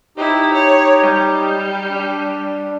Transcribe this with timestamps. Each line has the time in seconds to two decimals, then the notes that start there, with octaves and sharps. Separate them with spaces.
0.17 D#4 E4 G4
0.53 C#5
1.03 G3
1.90 D4